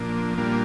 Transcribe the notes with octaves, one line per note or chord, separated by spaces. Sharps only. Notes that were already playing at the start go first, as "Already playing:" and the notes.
Already playing: A#2 F3 A#3 D4
A#2 G3 A#3 D4 F4